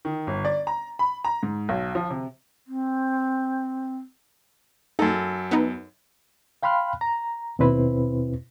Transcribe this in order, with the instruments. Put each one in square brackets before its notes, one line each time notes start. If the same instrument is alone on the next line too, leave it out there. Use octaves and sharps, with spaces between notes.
[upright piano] D#3
G1
D5
A#5
B5
A#5
G#2
B1
F3
C3
[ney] C4
[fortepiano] F#2 A4 [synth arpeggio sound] D#4
[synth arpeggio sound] B3 D#4
[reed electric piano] F5 G5 B5 C6 F6 F#6
A#5
D#2 B2 C4 E4 B4 C5